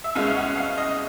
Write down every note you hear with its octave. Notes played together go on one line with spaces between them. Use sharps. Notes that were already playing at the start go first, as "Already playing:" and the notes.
E5
C2 B2 G#3 C#4 F5
F#5
F5
D#5